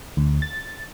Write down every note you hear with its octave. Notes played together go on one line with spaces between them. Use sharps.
D2
A6